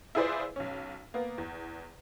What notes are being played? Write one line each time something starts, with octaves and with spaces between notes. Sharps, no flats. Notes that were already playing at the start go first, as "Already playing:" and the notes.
E4 F4 G#4 B4 C5 D5
B1 C#4
A#3 B3
E2